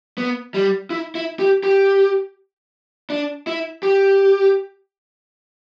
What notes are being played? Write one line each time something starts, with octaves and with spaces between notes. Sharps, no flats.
B3
G3
E4
E4
G4
G4
D4
E4
G4